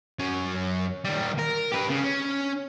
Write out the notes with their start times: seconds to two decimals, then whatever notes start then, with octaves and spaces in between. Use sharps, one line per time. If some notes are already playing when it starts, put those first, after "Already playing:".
0.19 F#2 C#4
1.05 D#3 G3
1.39 A#4
1.72 G4 B4
1.89 C#3
2.03 C#4